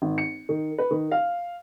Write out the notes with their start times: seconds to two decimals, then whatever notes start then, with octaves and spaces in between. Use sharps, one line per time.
0.02 G#1
0.18 C#7
0.49 D#3
0.78 B4
0.91 D#3
1.11 F5